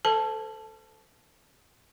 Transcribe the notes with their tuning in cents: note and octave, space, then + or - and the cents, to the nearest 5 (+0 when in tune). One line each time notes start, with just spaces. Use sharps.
A4 +0 C5 -35 A5 -10